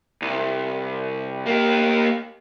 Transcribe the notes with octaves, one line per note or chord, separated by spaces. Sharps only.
C2
A#3 G4